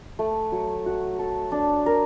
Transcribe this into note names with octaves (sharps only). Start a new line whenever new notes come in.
A3
F#3
F#4
A4
D4
A#4